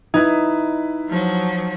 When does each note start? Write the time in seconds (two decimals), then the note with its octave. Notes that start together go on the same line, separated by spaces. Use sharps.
0.14 D#4 E4 B4 G#6
1.09 F3 F#3